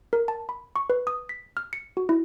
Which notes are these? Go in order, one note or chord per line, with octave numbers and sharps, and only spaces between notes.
A#4
A5
B5
C#6
B4
D#6
B6
F6
C#7
F#4
E4